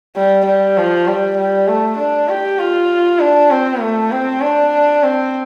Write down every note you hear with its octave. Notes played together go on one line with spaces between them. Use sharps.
G3
G3
F3
G3
G3
A3
D4
G4
F4
D4
C4
A3
C4
D4
C4